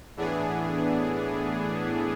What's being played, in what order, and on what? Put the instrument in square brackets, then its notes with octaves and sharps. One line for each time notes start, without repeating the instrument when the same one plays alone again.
[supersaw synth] A2 E3 B3 D4 G#4